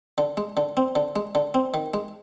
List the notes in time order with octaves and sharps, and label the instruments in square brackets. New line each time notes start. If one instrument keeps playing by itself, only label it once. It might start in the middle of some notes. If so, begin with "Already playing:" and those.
[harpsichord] D3
G#3
D3
C4
D3
G#3
D3
C4
D#3
G#3